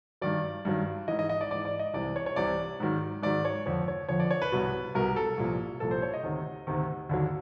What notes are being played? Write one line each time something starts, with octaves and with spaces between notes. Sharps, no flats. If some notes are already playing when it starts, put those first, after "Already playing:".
G2 D#3 F#3 D5
G2 D#3 F#3
G#2 E3 D#5
D#5
D#5
D5
G#2 E3 D5
D5
D#5
C2 C3 E3 D5
C#5
C#5
C2 C3 E3 D5
G#2 D#3 F#3
G#2 D#3 F#3 D5
C#5
F2 D3 F3 C#5
C#5
F2 D3 F3 C#5
D5
C#5
B4
C2 B2 F#3
C2 B2 F#3 A#4
A4
C2 A#2 F3
C2 A#2 F3 A4
C5
C#5
D#5
D2 C3 D#3
D2 C3 D#3
D#2 D3 F#3